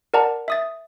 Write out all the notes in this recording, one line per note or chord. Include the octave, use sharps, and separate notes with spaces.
A#4 D5 F#5 A5 A#5
E5 D#6 A6